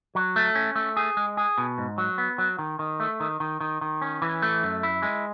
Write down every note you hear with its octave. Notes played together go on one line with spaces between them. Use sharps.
F#3
A3
C#4
A3
G#4
G#3
G#4
B2
G#2
F#3
B3
F#3
D#3
D#3
A3
D#3
D#3
D#3
D#3
C#4
E3
A3
F#2
E4
G#3